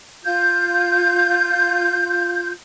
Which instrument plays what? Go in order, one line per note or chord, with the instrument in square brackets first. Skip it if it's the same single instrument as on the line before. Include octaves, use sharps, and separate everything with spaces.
[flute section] F4 G6